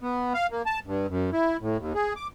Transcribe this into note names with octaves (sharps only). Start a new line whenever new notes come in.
B3
F5
A#3
A5
G2
F#2
E4
A2
D#2
G#4
D6